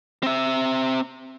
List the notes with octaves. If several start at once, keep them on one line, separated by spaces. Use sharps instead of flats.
C4 E5